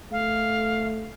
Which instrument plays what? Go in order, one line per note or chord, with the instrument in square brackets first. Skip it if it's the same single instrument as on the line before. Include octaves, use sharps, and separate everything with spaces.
[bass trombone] A3 [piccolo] F5